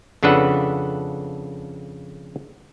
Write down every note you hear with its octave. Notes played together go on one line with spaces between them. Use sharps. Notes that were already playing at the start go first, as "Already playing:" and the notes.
F2 C#3 D4 A4 B4 F#5